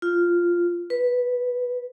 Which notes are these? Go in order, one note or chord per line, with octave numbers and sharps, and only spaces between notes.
F4
B4